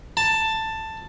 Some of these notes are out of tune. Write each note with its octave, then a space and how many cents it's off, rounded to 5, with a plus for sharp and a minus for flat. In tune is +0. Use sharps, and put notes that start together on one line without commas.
A5 +10